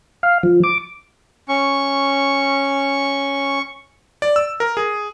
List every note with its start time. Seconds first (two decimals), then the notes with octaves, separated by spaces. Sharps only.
0.23 F5
0.43 F3
0.64 D6
1.48 C#4 C#6
4.22 D5
4.36 E6
4.60 A#4
4.77 G#4